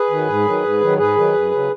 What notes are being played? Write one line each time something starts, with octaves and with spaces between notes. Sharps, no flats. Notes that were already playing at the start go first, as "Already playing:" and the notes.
Already playing: G#4 B4
D#3 F#3
G#2
D#3 F#3
G#2
D#3 F#3
G#2 G#4 B4
D#3 F#3
F#2
C#3 F#3